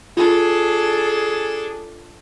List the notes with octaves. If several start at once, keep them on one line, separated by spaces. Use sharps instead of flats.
D4 F4 G#4 A4